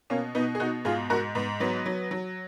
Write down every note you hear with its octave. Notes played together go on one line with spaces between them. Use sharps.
B2 A#3 C#4
B2 B3 D#4
G#4
B2 D#4 F#4
G#2 F4 G#4
G#2 F#4 A#4
G#2 B3
F#3 B3
F#3
F#3